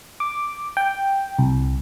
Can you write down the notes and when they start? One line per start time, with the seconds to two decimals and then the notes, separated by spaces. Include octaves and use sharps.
0.20 D6
0.77 G5
1.39 C2